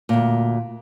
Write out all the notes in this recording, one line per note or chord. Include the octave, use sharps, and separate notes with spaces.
D2 A#2